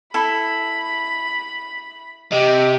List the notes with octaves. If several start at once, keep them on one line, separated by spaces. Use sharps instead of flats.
E4 A4 B5
C3 G4 D#5